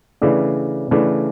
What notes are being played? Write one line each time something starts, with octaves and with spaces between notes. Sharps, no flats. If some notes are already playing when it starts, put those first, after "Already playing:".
C#3 E3 A3 D4
C#3 E3 A3 D4